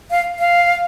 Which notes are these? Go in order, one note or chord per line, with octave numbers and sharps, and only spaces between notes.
F5
F5